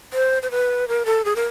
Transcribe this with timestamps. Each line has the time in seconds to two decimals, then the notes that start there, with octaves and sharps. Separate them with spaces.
0.13 C5
0.42 C5
0.51 B4
0.88 A#4
1.06 A4
1.25 G#4
1.36 A#4